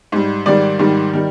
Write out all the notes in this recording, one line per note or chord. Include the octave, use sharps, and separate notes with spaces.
G#2 G3
G#2 D#3 G3 D5
G#2 D#3 G3
D#3 G3